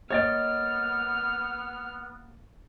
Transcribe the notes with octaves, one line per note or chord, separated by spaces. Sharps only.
A#3 B3 C#5 D#5 F6 A6 D7